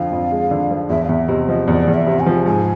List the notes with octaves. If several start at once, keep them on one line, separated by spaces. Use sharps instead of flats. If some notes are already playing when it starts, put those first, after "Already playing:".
Already playing: F2 D3 F3 F5
F2
G#3
D3
F3
E2 E5
F5
E2 E5
C3 D#5
F3 D#5
E2 D5
E2
E5
C3
G#5
F3
G#2 G#5